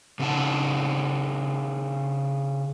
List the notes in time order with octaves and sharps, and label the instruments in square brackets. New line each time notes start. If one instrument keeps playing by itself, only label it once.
[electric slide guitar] C#3 C4 D#4 F#5 A5